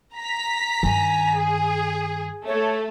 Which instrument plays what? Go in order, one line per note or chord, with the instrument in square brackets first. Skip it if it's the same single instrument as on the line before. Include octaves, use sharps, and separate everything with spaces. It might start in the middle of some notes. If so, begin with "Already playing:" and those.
[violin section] A#5 B6
[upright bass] G2 D#3 [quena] G#5
[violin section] G#4
[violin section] A3 [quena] C#5